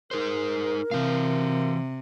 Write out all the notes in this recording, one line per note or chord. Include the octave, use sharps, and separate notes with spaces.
D#4 G#4 A#4 C5
C3 E3 F5